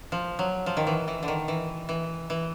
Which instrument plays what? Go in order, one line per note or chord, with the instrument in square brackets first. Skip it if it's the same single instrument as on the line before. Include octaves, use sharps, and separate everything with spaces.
[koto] F3
F#3
F3
D#3
E3
E3
D3
D#3
E3
E3
E3